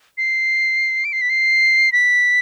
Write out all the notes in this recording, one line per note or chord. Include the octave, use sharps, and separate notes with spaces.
C7
D7
C7
B6
C7
B6